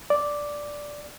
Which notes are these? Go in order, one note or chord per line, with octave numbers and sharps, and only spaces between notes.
D5